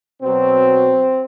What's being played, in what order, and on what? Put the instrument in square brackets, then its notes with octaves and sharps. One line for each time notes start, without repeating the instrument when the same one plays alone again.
[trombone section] B2 F#3 C4